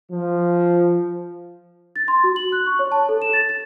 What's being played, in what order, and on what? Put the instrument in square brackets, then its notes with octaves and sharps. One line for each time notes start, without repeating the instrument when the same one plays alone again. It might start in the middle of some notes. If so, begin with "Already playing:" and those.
[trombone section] F3
[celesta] A6
C6
F#4
F#7
F#6
C#6
C#5
A5
A4
E7
A6
A6